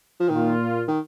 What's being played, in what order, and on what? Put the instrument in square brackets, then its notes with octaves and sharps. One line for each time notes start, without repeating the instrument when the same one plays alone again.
[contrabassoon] F3
[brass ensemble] A#2 A#3 F4 [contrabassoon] D#3
[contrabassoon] D#3